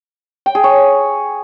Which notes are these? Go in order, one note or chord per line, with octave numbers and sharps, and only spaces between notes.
G5
G#4
C#5